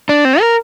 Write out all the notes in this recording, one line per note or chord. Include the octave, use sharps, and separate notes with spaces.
D4
C4
A#4